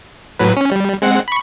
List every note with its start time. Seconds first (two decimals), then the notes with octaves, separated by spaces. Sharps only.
0.39 A2 F#3 B4
0.57 C#4
0.71 G3
1.02 G#3 C4 F#5
1.28 B5 C#6